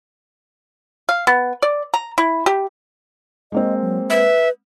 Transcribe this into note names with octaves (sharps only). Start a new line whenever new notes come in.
F5
B3
D5
A#5
E4
G4
G#3 A#3 C4 D#5
F#3
B4 E5